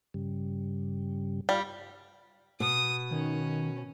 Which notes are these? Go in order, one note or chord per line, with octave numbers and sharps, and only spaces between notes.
G2 C#3 G3
G3 F4 F5 F6
B2 D#6
D#3 C#4